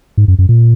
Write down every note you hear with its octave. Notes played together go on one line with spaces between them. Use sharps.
G#2
F#2
F#2
A#2